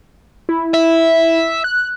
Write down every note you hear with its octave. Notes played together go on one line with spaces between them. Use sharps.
E4
E5
F#6